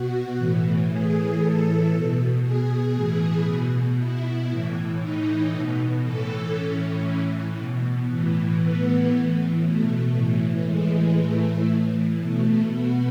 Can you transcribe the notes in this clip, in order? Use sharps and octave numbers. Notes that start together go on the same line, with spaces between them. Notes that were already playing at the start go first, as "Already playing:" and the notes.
Already playing: B2 F#4
A2 E3
A2 E3 G#4
A2 E3 A4
B2
B2 G#4
A2 E3 G#4
B2
B2 E4
A2 E3
A2 E3 D#4
B2
A2 E3 A4
A2 E3 C#4
A2 E3
B2
A2 E3
A2 E3 B3
A2 E3
B2 A3
A2 E3
A2 E3 G#3
A2 E3 A3
A2 E3
B2 A3
B2 B3